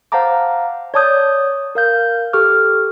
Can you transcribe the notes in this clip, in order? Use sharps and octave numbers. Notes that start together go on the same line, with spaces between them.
C5 F5 F#5 A5 A#5 D6
C#5 D5 A5 D6 D#6 G6
A#4 F5 G6
G4 A4 C#6 D6 F6